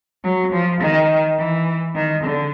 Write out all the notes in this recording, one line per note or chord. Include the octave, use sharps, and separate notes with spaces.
F#3
F3
D#3
E3
D#3
D3